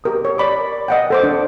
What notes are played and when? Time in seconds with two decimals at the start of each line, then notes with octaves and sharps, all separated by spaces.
0.04 G4 A#4 D#6
0.25 C#5
0.38 D5 B5 D6
0.88 D#5 F#5 G5
1.10 A4 C5 D6
1.23 D4